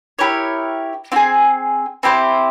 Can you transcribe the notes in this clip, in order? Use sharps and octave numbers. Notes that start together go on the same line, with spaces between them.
E4 G4 A#4 C#5
C4 F4 G#4
C4 E4 G4 C5